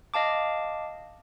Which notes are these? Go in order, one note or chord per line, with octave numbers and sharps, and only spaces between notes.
D#5 F5 A5 D6